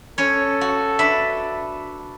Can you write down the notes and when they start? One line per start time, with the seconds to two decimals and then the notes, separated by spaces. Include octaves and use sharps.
0.18 C#4 A4 C#5
0.61 F#4
0.99 D4 B4 E5